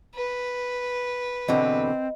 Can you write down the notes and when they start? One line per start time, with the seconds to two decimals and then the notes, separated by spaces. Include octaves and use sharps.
0.15 B4
1.48 E2 B2 D3 C4 D#5